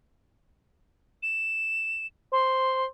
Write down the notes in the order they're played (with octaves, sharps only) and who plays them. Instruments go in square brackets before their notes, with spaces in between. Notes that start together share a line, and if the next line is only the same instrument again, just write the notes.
[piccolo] E7
[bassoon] C5 [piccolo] C6